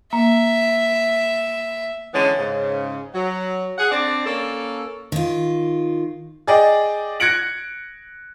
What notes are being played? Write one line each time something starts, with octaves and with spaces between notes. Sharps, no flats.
A#3 E5
D3 E3 G#3 B3 C#4
G#2 C#3
F#3
G#4 F#5
C4 D4 D5
A#3 C#4 A4
D#3 F4
G#4 D5 D#5 G5
F#6 G#6 A#6 C#7 D7 F#7